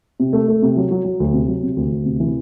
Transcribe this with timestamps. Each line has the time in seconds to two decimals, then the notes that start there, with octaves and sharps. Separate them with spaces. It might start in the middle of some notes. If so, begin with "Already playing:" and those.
0.20 C3
0.33 A3
0.48 A3
0.62 C3
0.77 F#3
0.91 F#3
1.05 F#3
1.20 D2
1.33 C3
1.48 F#3
1.63 C3
1.76 D2
1.92 D2
2.05 C3
2.20 E3